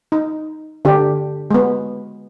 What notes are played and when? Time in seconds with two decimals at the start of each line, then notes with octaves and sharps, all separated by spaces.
0.12 D#4
0.85 D3 D4 G4
1.51 G#3 B3